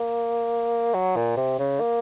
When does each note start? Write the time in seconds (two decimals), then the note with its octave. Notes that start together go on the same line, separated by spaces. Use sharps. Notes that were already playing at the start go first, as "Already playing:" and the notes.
Already playing: A#3
0.94 F#3
1.16 A#2
1.37 C3
1.59 C#3
1.80 A#3